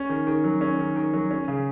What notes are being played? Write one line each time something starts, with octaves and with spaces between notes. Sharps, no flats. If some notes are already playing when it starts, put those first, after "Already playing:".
Already playing: C#4
D#3
D#3
F#3
C#4
D#3
D#3
F#3
C#4
C#3